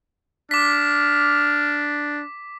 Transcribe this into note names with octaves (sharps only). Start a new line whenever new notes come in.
D4 D6 F6 B6